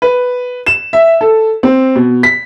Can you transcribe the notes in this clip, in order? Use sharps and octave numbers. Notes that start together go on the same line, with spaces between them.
B4
E7
E5
A4
C4
B2
B6